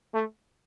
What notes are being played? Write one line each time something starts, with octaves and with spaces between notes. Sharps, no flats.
A3